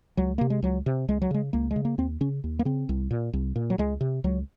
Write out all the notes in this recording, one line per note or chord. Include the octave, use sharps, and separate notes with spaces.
C#2 F#3
C3 A#3
G#3
C#2 F#3
C3
C#2 G#3
F#3
C#3 G#3
C#2 A#3
G#3
C#3
A#3
D#2 C4
C#3 C#4
D#2
A#3
C#3 C4
C2
A#2
C2
A#2
F#3
C#2 G#3
C3
C#2 F#3